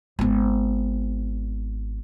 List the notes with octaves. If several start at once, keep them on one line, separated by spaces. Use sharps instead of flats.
G#1 B3